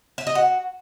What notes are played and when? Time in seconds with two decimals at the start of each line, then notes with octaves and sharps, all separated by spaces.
0.18 E5
0.27 D#5
0.35 F#4